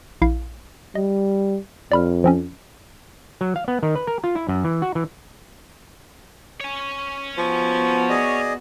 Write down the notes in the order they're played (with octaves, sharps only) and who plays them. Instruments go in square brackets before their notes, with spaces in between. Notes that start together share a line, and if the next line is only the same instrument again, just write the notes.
[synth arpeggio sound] A#1 E4 F5
[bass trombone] G3 [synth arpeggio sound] D#5
[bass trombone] F2 [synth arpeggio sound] D5 B5 F6
[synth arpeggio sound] F3 C4 C#4
[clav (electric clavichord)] F#3
F5
B3
D#3
B4
A#4
F4
E4
F#2
E3
F#4
E3
[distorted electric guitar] C#5 G#5
[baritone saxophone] F3 [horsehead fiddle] B3 F#4
[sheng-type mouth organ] G#4 D5 D#5